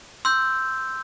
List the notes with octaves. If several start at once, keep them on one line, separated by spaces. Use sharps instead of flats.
C6 E6 G6